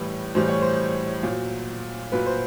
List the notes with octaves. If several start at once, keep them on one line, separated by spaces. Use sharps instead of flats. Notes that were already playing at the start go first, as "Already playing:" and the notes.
Already playing: A2 E3 G3 B4
A2 E3 G3 C5
C#5
C5
A#2 F#3
A#2 F#3 B4
C5